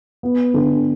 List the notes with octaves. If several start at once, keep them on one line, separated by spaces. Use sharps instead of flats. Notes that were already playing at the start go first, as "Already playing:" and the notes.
B3
D3